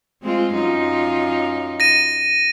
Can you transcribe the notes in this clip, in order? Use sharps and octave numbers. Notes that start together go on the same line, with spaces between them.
G#3 C4 F4
F#2 D#4 F4
A#6 D#7